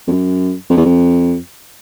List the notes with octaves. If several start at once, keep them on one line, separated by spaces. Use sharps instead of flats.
F2
F#2
F2
E2
F2